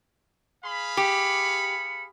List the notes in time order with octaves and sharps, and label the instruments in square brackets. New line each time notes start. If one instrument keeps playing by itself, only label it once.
[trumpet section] G#4 F5 B5
[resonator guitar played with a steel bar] G4 [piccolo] C#7